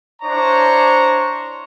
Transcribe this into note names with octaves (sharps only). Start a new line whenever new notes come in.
D4 E4 C5 C#5 A#5 C#6